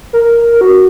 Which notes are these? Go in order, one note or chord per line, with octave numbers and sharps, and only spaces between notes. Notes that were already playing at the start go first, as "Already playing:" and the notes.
A#4
F#4